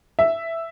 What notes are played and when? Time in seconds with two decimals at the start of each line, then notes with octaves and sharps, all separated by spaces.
0.19 E5